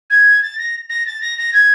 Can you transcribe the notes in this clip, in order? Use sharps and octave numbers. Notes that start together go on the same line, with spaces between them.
G#6
A6
A#6
A#6
A6
A#6
A#6
G#6